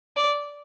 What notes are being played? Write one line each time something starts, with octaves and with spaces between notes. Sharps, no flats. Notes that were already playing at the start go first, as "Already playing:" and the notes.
D5